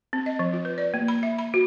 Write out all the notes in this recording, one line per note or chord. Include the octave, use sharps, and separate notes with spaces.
C4
D#5
F3
F4
B4
D5
A#3
B5
E5
B5
F#4